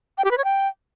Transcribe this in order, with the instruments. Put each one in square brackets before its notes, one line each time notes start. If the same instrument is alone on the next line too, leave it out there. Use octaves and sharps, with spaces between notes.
[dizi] G5
G4
B4
C#5
G5